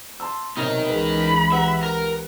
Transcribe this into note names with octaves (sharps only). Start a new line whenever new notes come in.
A5 C6 E6
B1 C3 D#4 A#4
C#2 E3 G#4 B4 B5
G4 B4 E5 F#5
A#4